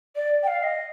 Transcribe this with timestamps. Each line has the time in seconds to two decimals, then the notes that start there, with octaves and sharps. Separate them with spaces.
0.16 D5
0.43 G5
0.47 F5
0.63 D#5